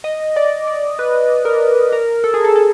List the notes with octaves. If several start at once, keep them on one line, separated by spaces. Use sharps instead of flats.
D#5
D5
D5
B4
A#4
A#4
A4
G#4
A4
A4